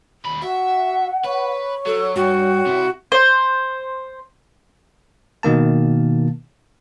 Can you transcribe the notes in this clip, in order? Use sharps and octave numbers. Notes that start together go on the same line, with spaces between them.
D#2 B5
F#4 E5 F#5
B4 C#5
F#3 A4
G2 F#4 G5
C3 E4
C5
B2 D#3 A#3 A5